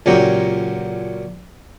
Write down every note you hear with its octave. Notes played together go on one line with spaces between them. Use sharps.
C#2 A#2 F#3 C#4 G4 A#5